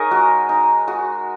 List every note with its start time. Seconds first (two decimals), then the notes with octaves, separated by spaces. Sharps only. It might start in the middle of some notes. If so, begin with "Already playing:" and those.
Already playing: D#4 G#4 A#4 C#5 D#5
0.11 G#3 F#4
0.49 D#4
0.87 G#3 F#4